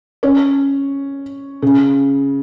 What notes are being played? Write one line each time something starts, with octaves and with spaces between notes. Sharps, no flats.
C#4
C#3